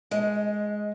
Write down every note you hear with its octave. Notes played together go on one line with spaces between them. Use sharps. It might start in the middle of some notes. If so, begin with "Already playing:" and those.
G#3